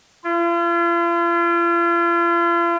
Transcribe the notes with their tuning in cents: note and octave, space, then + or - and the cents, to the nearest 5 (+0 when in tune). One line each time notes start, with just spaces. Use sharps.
F4 -40